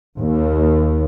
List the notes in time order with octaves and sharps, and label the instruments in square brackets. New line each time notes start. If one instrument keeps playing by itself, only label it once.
[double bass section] D#2